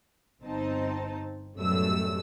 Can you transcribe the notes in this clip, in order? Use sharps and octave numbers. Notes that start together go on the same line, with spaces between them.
G1 C4 D#4 A5
A1 F#2 B2 G3 A3 E6